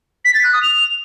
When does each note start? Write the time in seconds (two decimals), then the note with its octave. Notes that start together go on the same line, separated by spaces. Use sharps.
0.25 B6
0.34 A6
0.44 F#6
0.53 D#6
0.62 F7